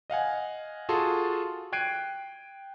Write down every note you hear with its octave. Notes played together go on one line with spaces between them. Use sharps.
D#5 F5 F#5 G#5
F4 F#4 G#4 A4 A5 C6
G5 F#6 G#6 C7 D7 D#7